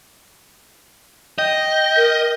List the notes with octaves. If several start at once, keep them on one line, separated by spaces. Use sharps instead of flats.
D#5 G5
A#4